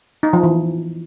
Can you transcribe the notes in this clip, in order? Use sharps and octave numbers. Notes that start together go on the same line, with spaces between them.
D#4
F3
E3